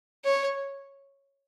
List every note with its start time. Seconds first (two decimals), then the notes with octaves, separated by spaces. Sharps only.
0.24 C#5